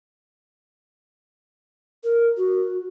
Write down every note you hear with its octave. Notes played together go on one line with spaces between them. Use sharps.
A#4
F#4